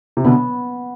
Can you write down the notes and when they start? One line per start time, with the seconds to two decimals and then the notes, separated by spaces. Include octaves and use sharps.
0.17 C3
0.24 B2 D3 B3